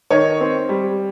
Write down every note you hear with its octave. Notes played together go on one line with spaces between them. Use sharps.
D#3 C#5 D#5
C4
G3